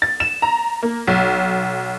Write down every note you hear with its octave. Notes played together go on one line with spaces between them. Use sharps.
A6
E7
A#5
A#3
B1